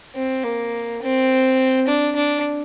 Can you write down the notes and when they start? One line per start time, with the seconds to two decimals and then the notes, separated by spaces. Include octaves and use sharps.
0.15 C4
0.44 A#3
1.02 C4
1.87 D4
2.16 D4